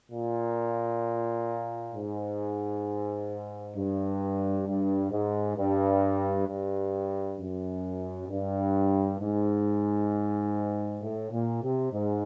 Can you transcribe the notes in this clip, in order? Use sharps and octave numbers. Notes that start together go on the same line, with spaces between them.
A#2
G#2
G2
G2
G#2
G2
G2
F#2
G2
G#2
A2
A#2
C3
G#2